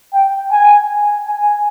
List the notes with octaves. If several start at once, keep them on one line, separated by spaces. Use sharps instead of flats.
G5
G#5
G#5